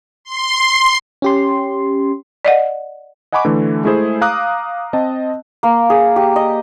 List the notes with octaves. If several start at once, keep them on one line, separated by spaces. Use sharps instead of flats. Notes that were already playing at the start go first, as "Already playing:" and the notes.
C6
C#4 G4 C6
D5 D#5 F#5
D#5 F#5 G#5 B5 C#6 D6
D3 E3 A3
G#3 A3 E4 G#4 C5
F5 A#5 D6 D#6 F#6
C4 D#5 A5
A#3
G#4
G4
D#5